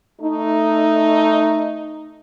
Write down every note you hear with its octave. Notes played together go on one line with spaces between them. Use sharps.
A3 D#4